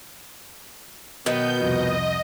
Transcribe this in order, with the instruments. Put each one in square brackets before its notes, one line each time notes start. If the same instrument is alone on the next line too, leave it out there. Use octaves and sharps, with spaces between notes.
[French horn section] B2 [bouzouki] D#3 B3 [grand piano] F#3 [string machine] G6
[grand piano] C2 F2 F3 [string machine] D#5